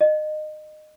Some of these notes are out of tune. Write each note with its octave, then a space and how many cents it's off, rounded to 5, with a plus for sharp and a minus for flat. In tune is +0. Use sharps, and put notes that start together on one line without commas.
D#5 -25